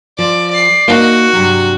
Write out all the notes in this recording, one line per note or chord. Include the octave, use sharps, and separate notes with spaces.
F3 D5
D5 C7
A#3 D#4 F#4
G2 C3 F#3